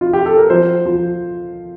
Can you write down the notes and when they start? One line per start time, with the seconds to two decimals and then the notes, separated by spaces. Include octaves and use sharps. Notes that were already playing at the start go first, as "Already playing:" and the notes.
0.01 F4
0.13 G4
0.26 A4
0.37 A#4
0.50 F3 C5
0.86 F3